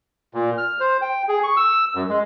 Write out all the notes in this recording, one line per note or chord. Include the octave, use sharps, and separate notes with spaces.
A#2
F6
C5
G5
G#4
C#6
E6
F#2
G#3